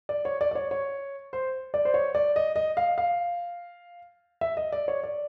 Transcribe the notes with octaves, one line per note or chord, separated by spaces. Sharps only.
D5
C#5
D5
D5
C#5
C#5
C5
D5
C5
C#5
D5
D#5
D#5
F5
F5
E5
D#5
D5
C#5
D5